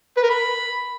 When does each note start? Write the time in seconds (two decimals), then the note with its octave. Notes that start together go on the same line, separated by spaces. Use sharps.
0.17 B4
0.23 A#4
0.29 B5